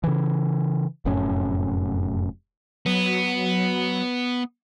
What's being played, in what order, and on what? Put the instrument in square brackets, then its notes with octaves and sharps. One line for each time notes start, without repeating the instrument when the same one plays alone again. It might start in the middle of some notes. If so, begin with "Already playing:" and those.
[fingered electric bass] C#3 E3
F1 F#2 A2 C#4
[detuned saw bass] F#3 [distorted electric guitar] B3